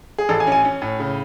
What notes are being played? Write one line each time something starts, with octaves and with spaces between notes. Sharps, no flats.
G#4
A1 A4
G#5
C#4
G#5
C#4
A2
C#3